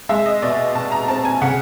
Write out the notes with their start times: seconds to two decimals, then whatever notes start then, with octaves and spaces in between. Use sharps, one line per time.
0.09 G#3 E5
0.26 D#5
0.42 B2 D5
0.75 B2 A5
0.92 A#5
1.08 C4 A5
1.25 G#5
1.42 C#3 F#5